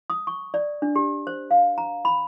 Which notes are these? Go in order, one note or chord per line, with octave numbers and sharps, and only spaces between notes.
D#6
C#6
D5
D4
G4
C5
F5
A#5
B5